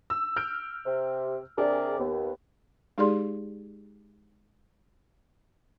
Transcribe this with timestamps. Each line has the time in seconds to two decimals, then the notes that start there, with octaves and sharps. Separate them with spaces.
0.10 E6
0.36 F6 G6 D7
0.86 C3
1.58 C3 D4 G#4 A#4 D5
1.99 D#2 B3
2.98 G#3 D#4 G4 G#4 D5 C6